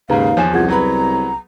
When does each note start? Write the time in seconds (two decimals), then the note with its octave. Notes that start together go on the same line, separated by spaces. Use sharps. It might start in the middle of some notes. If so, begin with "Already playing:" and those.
0.10 D#2 G#2 C#3 B4 F5 A#5
0.37 E2 F3 C#5 G#5 E7
0.54 C2 F4 G#4 F#5 G#6
0.68 F#3 B3 A#5 B5